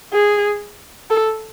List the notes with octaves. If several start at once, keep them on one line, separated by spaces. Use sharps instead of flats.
G#4
A4